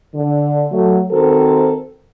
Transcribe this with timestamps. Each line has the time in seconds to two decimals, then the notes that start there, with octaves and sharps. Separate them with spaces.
0.15 D3
0.72 F#3 A3
1.12 D#3 C4 F#4 A4 A#4 C5